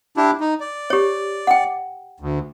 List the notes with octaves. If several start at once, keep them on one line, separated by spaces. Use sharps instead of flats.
D4 E4 G4
D#4
D5
G4 C#5
F#5 G5
D2